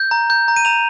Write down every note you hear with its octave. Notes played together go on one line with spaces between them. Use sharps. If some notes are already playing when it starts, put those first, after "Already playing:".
Already playing: G6
A#5
G6
A#5
D#7
A#5 F7